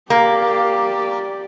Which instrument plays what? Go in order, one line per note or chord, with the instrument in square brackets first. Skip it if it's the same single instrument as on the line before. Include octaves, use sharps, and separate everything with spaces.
[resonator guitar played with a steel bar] A#3 [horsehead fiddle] G4 D5